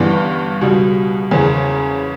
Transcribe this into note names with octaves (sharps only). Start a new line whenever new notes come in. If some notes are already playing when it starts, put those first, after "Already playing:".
Already playing: G1 G2 E3 B3 D4
C#2 B2 G3
F#1 E2 C#3